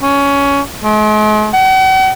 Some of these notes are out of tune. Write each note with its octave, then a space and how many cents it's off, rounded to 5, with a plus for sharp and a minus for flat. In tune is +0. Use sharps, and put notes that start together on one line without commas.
C#4 +15
G#3 +45
F#5 +45